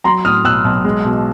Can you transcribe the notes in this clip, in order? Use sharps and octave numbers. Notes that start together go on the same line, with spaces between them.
F#3 A#5 C6
A2 D#6 F6
B1 E6 F#6
B1
G#3
B2